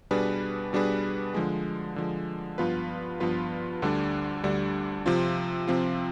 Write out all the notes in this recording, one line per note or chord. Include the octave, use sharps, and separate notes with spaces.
B2 G3 D4 G#4 B4
B2 G3 D4 G#4 B4
D3 F3 G#3
D3 F3 G#3
G2 F3 B3 F4 B4
G2 F3 B3 F4 B4
D2 D3 G3 D4
D2 D3 G3 D4
C3 F3 C4 F4
C3 F3 C4 F4